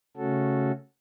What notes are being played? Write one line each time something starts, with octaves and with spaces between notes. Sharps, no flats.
C#3 A3 C#4 F#4 A4